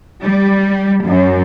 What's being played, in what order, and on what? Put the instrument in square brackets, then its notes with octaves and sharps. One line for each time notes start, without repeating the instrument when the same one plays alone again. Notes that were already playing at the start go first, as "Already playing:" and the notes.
[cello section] G3
F#2